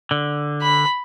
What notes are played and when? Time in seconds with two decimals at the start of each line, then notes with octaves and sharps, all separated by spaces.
0.11 D3
0.62 B5